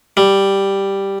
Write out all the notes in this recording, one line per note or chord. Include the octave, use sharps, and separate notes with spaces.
G3